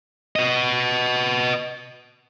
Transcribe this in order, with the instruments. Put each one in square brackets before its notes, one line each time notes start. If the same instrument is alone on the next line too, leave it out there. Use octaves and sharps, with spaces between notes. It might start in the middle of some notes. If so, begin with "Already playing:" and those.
[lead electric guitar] B4 D#5